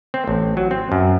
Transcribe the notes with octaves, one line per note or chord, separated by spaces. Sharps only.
C4
A1
F#3
C4
F#2